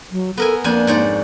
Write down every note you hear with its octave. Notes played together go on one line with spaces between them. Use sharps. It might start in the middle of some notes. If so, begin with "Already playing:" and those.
F#3
B3 A4 A#4 G#5
F2 A#3 D4 G#5
G#2 C#5 D5